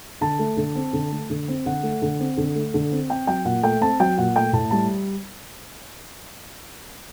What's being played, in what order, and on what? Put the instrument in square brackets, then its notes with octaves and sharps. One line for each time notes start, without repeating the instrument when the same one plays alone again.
[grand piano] D3 A5
A3
D3
C4
D3
A3
D3
C4
D3 F#5
A3
D3
C4
D3
A3
D3
C4
C4 G5
F#3 G5
A#2 F#5
A3 G5
C4 A5
F#3 G5
A#2 F#5
A3 G5
A2 A5
G3 A5